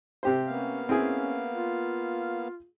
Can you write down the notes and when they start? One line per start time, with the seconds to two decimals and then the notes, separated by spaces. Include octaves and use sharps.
0.23 C3 G4 C5
0.47 A#3 B3 C#4 F5
0.89 C4 C#4 E4 G#4
1.53 F4